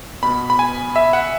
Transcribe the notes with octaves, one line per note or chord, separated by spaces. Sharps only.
B2 B3 B5
B5
G#5
E5
F#5